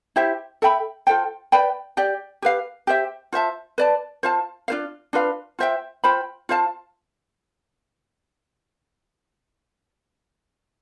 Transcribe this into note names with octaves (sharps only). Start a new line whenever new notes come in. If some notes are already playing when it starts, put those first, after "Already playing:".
E4 G4 C5 E5
A4 E5 G5 B5
F4 A4 C5 G5
B4 D5 G5 B5
G4 D5 G5
G4 B4 F5
G4 C5 E5
F4 C5 E5 A5
B4 D5 A5
F4 C5 F5 A5
D4 F4 C5 F5
D4 F4 B4 F5
F4 C5 E5 G5
F4 C5 G5 B5
F4 C5 F5 A5